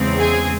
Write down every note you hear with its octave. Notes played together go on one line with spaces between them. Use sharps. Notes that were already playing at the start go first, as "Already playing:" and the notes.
Already playing: E2 C#3 G#3 C4
G#4